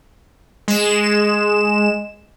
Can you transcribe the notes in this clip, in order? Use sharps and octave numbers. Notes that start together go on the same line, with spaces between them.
G#3 E7